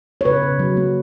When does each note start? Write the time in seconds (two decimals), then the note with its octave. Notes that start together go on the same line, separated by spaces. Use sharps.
0.21 C#5
0.25 C#3 B4
0.42 C#3
0.59 F#3
0.77 A#3